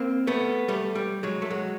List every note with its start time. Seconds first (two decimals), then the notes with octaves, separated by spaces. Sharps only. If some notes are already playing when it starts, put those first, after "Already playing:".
Already playing: A#3 C4
0.27 A3 B3
0.68 G3 A3
0.95 G3
1.23 F#3 G#3
1.42 A3
1.51 F#3 G#3